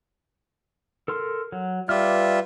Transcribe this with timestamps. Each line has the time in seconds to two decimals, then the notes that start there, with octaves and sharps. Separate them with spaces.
1.08 A4 A#4 C6
1.52 F#3
1.89 G3 F4 B4 E5 D6 F6